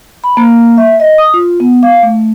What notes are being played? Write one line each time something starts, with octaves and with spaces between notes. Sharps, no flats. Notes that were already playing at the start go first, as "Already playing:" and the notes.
B5
A#3
E5
D#5
D#6
F4
B3
F5
A3